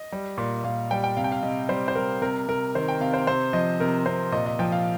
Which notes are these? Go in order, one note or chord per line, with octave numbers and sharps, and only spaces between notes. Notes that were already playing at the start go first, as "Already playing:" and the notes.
Already playing: D#5
G3
A#2
A#2 F5
G3 G5
G5
C3 F5
G5
F5
C3 D#5
G3 C5
C5
G3 A#4
C3 A#4
C3 A#4
D#3 C5
G5
C3 F5
C5
C3 C5
F3 D#5
C3 A#4
C3 C5
A#2 D#5
D#5
F3 G5
F5